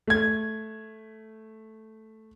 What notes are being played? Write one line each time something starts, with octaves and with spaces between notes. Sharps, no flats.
A3 G#6